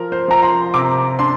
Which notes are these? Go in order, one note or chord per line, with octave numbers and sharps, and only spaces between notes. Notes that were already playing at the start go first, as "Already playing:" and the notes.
Already playing: F3 A#4
C5
F3 A#5
C6
C3 D6
D4 C6